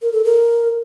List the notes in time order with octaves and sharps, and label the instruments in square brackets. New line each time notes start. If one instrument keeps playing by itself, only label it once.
[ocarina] A#4
A4
A#4